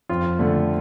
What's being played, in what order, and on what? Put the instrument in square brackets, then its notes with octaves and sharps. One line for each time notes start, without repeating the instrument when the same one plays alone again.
[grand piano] F2 F4
D3 A3